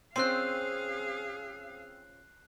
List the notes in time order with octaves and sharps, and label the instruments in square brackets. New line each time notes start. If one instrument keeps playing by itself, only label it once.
[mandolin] C4 [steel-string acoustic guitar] C#4 F4 C5 [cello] G#4 F5 [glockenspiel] F#6 C7